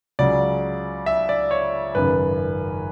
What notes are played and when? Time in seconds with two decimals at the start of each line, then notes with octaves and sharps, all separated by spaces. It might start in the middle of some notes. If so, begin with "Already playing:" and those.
0.19 C#2 C#3 F#3 D5
1.06 E5
1.29 D5
1.51 C#5
1.95 G#1 F#2 C#3 B4